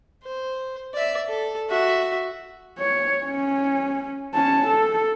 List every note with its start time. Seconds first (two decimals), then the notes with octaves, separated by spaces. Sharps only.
0.24 C5
0.94 D5 E5
1.28 A4
1.70 F#4 E5
2.79 C#5
3.25 C#4
4.34 C#4 A5
4.67 A4